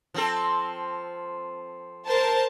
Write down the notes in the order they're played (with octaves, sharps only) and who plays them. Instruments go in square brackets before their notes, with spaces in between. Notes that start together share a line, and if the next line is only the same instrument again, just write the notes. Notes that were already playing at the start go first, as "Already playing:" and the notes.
[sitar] F3 C4 A4
[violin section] A#4 C5 A5